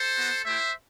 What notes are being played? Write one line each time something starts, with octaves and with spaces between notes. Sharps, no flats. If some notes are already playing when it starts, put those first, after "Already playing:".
Already playing: A4 C5
B3 F#4
A3 E4 G4 C5 E5